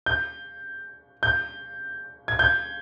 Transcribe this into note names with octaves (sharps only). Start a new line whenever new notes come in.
G6
G6
G#6
G6